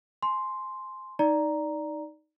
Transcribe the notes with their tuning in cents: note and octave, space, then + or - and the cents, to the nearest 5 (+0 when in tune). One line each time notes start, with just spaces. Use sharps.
G#5 +35 C6 +0
D#4 +0 D5 +0 A#5 +0